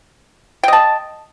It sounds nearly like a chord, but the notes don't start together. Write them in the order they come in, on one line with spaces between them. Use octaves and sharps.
G5 D#5 A5